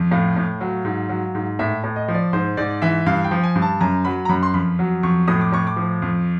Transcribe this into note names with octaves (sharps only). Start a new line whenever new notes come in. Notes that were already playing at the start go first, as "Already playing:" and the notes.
Already playing: F2
A2 F5
A2
F#3
G#2
F#3
G#2
A2 E5
A2
D#5
F3
D5
G#2 C5
G#2 D5
E3 E5
G2 F5
G5
F3
G#5
G2
A5
F#2 A#5
F#3 B5
A#5
F#2 B5
C6
F2 B5
F#3
F2 C#6
A2 D#6
D6
A2 C#6
D6
F3
F2